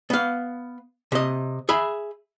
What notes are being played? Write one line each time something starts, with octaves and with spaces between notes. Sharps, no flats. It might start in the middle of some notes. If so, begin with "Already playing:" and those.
B3 F5
C3 D#5
G#4 E5 B5